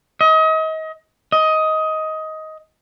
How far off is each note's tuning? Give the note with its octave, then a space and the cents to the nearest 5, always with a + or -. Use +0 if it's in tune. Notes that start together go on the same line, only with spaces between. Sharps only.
D#5 +35
D#5 +15